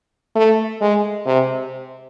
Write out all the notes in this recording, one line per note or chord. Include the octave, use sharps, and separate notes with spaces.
A3
G#3
C3